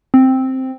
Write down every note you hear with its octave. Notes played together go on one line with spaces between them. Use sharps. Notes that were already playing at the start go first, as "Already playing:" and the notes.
C4